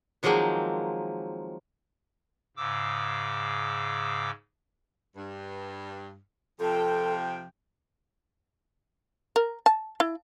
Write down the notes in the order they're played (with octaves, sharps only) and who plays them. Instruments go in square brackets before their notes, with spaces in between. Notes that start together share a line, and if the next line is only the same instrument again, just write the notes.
[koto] D#3 F3 F#3 G#3 A#3 C4
[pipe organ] G#2 C#3 D6 E6
[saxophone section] G2
[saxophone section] F2 C3 F3 [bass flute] A4 [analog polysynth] G5
[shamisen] A#4
A5
E4